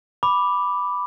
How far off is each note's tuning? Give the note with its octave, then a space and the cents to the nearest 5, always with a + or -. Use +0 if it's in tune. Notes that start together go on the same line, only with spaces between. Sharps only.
B5 +0 D6 +0